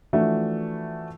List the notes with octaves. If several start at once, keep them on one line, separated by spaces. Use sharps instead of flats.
E3 F3 A3 D4 E4 F#4